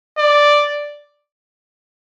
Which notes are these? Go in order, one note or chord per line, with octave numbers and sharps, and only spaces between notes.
D5